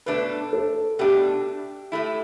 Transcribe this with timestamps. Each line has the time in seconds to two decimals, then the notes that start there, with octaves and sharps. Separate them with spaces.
0.06 B2 A3 D4 B4
0.53 A4
0.99 B2 A3 D4 G4
1.92 A2 A3 E4